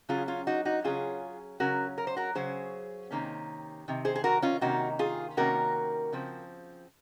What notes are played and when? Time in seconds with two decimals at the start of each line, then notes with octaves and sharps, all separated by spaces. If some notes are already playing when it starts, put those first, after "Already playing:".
0.09 C#3 F#3 C#4 F4 G#4
0.28 C#4 F4
0.47 D#4 F#4
0.65 D#4 F#4
0.84 C#3 F#3 C#4 F4 G#4
1.60 C#3 F#3 C#4 F#4 A#4
1.98 A#4
2.07 C5
2.16 F#4 A#4
2.35 C#3 F#3 C#4 G#4 C5
3.11 C3 D#3 A#3 C#4
3.88 C3 D#3
4.05 G#4 C5
4.16 G#4
4.24 F#4 A#4
4.42 C#4 F4
4.61 C3 D#3 A#3 C#4 D#4 F#4
4.99 F4 G#4
5.37 C3 D#3 A#3 C#4 F#4 A#4
6.12 C#3 F3 C4